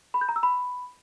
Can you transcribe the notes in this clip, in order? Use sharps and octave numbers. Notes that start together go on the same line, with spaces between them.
B5
G6
A#5
E6
B5